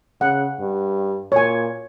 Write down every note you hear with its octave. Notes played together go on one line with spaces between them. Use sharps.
C#3 F#5
G2
A#2 C#5 G#5